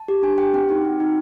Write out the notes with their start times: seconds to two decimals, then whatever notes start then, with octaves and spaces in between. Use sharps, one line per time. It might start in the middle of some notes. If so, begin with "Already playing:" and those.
Already playing: A5
0.08 G4
0.23 D4 G#5
0.38 G4 G5
0.53 C4 G5
0.69 D#4 F#4 G5
0.85 C4
1.00 D#4 F#4